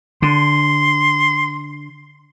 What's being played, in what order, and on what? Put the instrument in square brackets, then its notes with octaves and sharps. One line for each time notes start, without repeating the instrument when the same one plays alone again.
[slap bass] D3 [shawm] C6